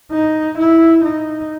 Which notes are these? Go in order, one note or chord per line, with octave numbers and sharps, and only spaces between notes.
D#4
E4
D#4